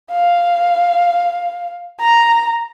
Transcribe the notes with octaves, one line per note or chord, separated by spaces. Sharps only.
F5
A#5